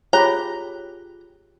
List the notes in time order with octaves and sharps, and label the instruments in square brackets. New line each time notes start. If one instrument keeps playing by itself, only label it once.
[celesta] F4 F#6 G7 [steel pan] G4 G#4 B5 [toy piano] C#5 [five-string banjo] A#5